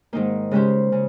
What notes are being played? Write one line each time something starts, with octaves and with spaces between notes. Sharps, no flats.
G#2 D#3 A#3 D#4
C#3 G#3 C#4 G4 C5
C#3